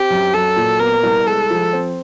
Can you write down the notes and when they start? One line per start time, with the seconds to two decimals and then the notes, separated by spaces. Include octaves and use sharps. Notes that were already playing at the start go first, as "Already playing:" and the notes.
Already playing: C4 G4
0.10 F#2
0.33 F#3 A4
0.56 A#2
0.79 B3 A#4
1.03 C2
1.27 G#3 A4
1.50 F3
1.73 C4